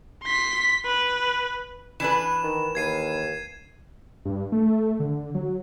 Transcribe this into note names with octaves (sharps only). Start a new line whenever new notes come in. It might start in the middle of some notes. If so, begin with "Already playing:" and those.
C6 B6
B4
E3 D4 B4 E7
D#3
D#2 G#6 C7 D#7
G2
A3
D3
F#3